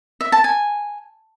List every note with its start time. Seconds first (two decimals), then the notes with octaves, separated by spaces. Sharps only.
0.21 E5
0.32 A5
0.44 G#5